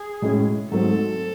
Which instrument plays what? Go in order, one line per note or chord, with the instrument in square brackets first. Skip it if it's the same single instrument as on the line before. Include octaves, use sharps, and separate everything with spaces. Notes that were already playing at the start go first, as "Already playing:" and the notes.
Already playing: [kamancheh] G#4
[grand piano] A2 G#3 C#4
[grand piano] G#2 F#3 A3 C4 [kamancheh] A4